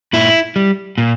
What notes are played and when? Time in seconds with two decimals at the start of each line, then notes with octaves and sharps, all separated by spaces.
0.13 A#2 E4
0.56 G3
0.98 A#2